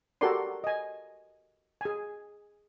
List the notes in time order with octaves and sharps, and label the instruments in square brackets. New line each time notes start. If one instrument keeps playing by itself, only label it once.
[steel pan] F#4 G4 A4 A#4 D5 C6
D#5 G#5
G#4 G#5